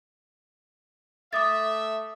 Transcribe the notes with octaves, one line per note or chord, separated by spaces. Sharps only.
A3 E5 D6 D#6 A6